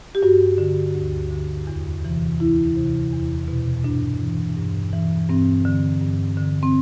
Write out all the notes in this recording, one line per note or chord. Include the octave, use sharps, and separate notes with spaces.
G4
G2 F#4
D3
D2
D3
E2
C3 E3
D2 E4
C3 E3
E2
B2
G2 D4
E3
G2
E3
G2 C4
D3
G2
D3
C4